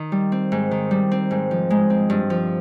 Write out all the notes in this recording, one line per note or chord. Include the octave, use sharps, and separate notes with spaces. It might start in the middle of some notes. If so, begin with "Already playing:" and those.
Already playing: D#3
G3
C4
G#2
D#3
G3
C4
G#2
F3
G#3
C4
G2
F3